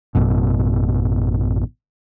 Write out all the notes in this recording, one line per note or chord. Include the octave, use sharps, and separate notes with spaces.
A1 F#2 B2